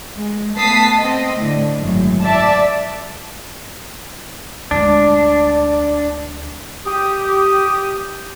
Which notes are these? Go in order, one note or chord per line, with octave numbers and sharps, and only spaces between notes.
G#3
A3 B3 A5 D#6 B6 C7
C4 D#5
A2 D3
G#1 F#2 A2
D5 E5 A5
D2 G#3 D4
G4 D#6